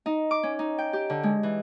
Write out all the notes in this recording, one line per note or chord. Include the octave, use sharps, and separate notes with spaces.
D#4
D6
C#4
D#4
G5
G4
D3
G#3
E3